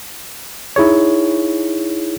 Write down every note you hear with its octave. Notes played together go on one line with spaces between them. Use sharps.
D#4 E4 G#4 C#5